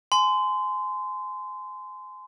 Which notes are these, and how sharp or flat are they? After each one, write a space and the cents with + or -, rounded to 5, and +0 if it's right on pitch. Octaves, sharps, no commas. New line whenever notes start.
G#5 +25 C6 -25